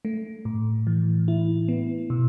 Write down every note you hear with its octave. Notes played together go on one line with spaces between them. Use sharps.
A3
A2
E3
E4
B3
B2